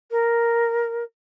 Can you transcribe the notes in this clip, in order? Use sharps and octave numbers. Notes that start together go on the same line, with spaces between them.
A#4